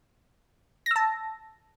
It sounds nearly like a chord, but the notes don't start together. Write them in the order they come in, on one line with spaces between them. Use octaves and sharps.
A#6 E6 A5